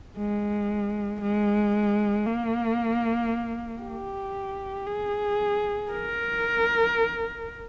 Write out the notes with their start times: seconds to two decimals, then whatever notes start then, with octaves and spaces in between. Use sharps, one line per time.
0.17 G#3
1.21 G#3
2.26 A#3
3.82 G4
4.86 G#4
5.91 A#4